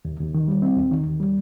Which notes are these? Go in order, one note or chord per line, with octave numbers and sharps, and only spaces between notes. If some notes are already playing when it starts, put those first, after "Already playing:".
D#2
D#2
D#3
G3
C4
D#2
D#3
D#2
G3